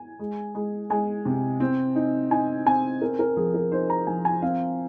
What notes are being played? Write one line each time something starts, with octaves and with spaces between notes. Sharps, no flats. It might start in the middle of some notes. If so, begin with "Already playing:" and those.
Already playing: G#5
G#3
G#3
G#3 G#5
C3
C4
D#4
D#4 G#5
C4 G#5
C4 A#4
A#4
F3 G#4
A#4
D#4 C5
A#5
F3 G#5
G#5
C4 F5